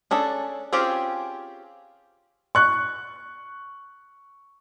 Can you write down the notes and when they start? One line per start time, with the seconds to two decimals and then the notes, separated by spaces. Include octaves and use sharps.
0.11 C#4 D4 G#4 A4
0.73 C4 C#4 F4 G4 G#4
2.55 C#6 F#6